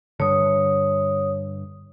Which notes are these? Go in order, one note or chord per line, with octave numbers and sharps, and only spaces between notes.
G2 D3 C#5 D#6